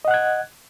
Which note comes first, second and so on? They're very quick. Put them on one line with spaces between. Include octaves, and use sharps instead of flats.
D#5 F#5 F#6 G#6